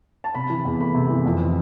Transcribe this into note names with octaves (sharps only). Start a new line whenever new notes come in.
A5
C3 B5
E3
E2
A3 B5
C3
E3
F2
E3